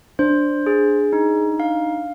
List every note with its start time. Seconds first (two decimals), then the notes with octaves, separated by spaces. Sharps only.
0.19 D4 C5
0.67 G#4
1.13 D#4
1.60 F5